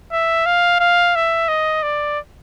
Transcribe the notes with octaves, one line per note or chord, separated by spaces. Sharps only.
E5
F5
F5
E5
D#5
D5